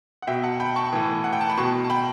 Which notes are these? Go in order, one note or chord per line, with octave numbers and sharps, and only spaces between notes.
F#5
B2 E5 G5
F#5 A5
G5 B5
A5 C#6
A2 E3
F#5
G5
A5
B5
B2 A5 C#6
A5
G5 B5